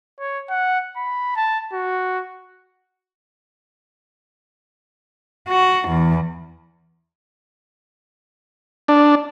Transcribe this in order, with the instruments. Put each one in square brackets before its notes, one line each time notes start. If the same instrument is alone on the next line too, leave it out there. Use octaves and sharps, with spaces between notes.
[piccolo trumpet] C#5
F#5
B5
A5
F#4
[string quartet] F#4
E2
[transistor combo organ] D4